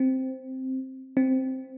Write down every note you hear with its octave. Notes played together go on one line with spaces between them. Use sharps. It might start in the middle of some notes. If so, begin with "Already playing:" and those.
Already playing: C4
C4